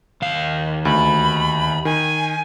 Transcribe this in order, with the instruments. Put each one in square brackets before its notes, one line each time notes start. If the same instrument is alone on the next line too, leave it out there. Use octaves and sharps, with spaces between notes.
[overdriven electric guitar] D#2 F5
[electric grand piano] D2 [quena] B5
[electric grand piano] D#3 [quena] G#5